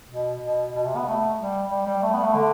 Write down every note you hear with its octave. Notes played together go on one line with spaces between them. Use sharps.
B2
B2
B2
C3
B3
A3
G3
G3
G3
A3
B3
A3
D3